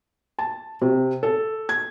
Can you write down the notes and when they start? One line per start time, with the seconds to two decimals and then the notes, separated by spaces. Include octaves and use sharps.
0.39 A5
0.81 C3
1.23 A4
1.69 G#6